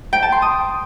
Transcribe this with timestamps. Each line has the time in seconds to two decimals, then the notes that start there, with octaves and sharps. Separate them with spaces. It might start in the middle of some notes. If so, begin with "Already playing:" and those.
0.13 G5
0.22 A5
0.32 C6
0.42 D#6